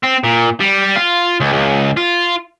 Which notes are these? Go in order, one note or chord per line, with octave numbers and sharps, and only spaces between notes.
C4
A#2
G3
F4
C#2
C#2
F4